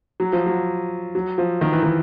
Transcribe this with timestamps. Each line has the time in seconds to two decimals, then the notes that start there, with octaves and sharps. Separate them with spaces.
0.20 F#3
0.33 F3
0.46 F#3
1.15 F#3
1.38 F3
1.61 D#3
1.72 E3
1.83 D#3